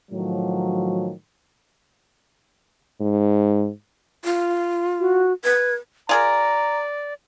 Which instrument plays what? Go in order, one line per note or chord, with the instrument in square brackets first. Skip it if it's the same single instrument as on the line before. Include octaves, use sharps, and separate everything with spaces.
[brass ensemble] A2 D#3 F3 F#3
[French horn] G#2
[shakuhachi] F4
[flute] F#4
[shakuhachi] B4 [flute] G#6
[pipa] F4 G#4 A#4 [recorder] D5 [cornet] A#5